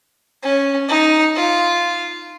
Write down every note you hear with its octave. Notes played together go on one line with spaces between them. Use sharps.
C#4
D#4
F4